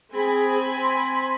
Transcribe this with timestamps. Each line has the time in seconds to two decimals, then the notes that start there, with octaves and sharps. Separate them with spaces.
0.14 C4 G#4 G#5 B5
0.78 C6